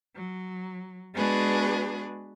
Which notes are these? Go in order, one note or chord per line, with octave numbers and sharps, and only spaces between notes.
F#3
G#3 B3 D4 F#4 G#4 B4